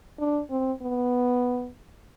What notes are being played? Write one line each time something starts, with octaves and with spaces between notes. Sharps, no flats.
D4
C4
B3